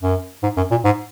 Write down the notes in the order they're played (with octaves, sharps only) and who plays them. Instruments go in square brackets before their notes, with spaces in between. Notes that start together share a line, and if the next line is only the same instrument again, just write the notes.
[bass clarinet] F#2
G#2
F#2
A#2
G#2